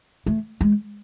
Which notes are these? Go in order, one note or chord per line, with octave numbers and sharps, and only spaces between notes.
A3
G#3